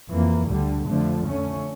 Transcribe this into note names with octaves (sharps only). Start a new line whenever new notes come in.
F2 E3 A#3
D2 D3 G3
F2 D3 F3 A3
F2 D3 A3 C#4